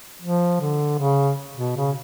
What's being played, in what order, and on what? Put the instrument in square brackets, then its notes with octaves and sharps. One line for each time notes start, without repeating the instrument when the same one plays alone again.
[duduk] F3
D3
C#3
B2
C#3